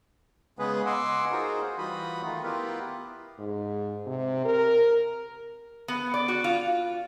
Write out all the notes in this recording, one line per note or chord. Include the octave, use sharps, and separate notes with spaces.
C#3 G#3 B3 G#4 B4
D#5 F#5 G#5 C6 D6 E6
D#4 F4 F#4 G#4 A#4 C5
E3 G3 F4 F#4 B5 D#6
D#3 A3 D#4 F4
B3 E4 F4 G4 A#4 B4
G#2
C3
A#4
B3
D5
F#4
F4